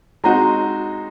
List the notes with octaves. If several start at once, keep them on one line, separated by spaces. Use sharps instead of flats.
G#3 C4 D#4 F#4 A#5